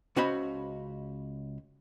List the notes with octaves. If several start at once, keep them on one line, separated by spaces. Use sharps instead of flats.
C#2 C#4 F#4 C5 D#5 B5